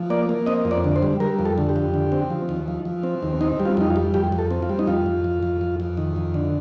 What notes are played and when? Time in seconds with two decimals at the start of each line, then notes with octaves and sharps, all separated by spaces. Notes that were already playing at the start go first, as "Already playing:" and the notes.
Already playing: F3
0.10 A#3 D5
0.29 A#3
0.46 C4 D#5
0.65 F2
0.71 D5
0.84 D3
0.96 C5
1.03 G3
1.20 G3 A#4
1.39 F2
1.45 A4
1.58 D3
1.69 G4
1.76 F2
1.94 D3
2.12 C4
2.30 F3
2.49 D#2
2.68 F3
2.85 F3
3.03 C4
3.23 D#2
3.41 C4 D#4
3.60 G3
3.65 F4
3.77 F2 D#4
3.90 F4
3.96 G3
4.14 F2 G4
4.32 F2
4.39 A4
4.51 C4
4.62 F4
4.69 G3
4.79 D#4
4.87 F2 F4
5.06 F2
5.24 F2
5.43 F2
5.61 F2
5.80 F2
5.97 D#3
6.16 F2
6.34 D3